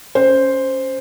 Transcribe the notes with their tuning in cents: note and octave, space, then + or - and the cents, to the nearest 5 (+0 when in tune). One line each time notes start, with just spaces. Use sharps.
C#4 +0 C5 +0